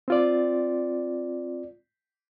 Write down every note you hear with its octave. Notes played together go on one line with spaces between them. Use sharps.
C4 F4 D5